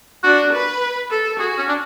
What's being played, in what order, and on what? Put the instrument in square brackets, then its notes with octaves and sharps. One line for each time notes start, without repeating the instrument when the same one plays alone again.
[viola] D4 [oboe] F#4
[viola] B4
A4
[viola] F#4 [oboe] G#4
[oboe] C#4
D4